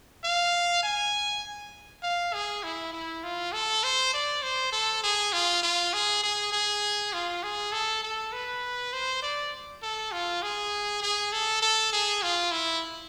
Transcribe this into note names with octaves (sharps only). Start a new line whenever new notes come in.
F5
G#5
F5
G#4
E4
E4
F4
A4
C5
D5
C5
A4
G#4
F4
F4
G#4
G#4
G#4
F4
G#4
A4
A4
B4
C5
D5
A4
F4
G#4
G#4
A4
A4
G#4
F4
E4